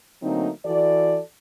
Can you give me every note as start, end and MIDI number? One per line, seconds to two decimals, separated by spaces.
0.22 0.49 50
0.22 0.49 54
0.22 0.49 57
0.22 0.49 58
0.22 0.49 60
0.22 0.49 63
0.65 1.20 52
0.65 1.20 66
0.65 1.20 69
0.65 1.20 74